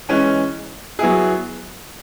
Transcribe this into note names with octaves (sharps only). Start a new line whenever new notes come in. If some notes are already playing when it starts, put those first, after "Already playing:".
E3 G#3 C#4
F#3 B3 E4 G#4